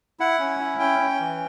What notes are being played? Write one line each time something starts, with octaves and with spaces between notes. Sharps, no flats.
E4 F#5
C#4
E4
C#4 G5
C#4
E3